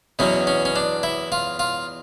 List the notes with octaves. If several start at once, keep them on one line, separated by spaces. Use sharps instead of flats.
E2 B2 F#3 C#4
C#4
C#4
D4
E4
F4
F4